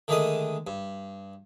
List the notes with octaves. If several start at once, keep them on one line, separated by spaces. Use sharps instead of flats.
D3 D#3 G#3 A3 D#5
G2